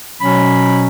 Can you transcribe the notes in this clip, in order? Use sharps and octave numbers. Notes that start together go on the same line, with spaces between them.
B2 F#3 C#4 B5